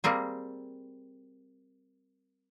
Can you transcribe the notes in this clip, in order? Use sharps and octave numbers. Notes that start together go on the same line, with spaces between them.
G3 A#3 C4 G#4